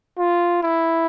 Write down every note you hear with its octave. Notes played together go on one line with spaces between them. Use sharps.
F4
E4